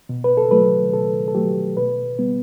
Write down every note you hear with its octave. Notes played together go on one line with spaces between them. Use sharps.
B2
B4
A4
F#3 A3 B4
B2 A4
A4
F#3 A3 G4
B2 B4
G3 B3